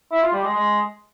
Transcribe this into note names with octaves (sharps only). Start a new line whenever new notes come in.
E4
F4
G3
G#3
G#3